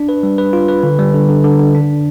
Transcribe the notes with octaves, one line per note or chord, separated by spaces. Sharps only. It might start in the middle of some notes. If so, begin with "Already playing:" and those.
Already playing: D4
B4
G3
B4
F4
B4
D3
G3
D3
D3
D3
D3
D4